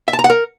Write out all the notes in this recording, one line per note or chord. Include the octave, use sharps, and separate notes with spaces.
E5
A5
A#5
F#5
A#4